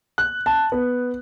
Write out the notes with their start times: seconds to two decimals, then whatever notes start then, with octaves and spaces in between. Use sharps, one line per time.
0.18 F#6
0.46 A5
0.72 B3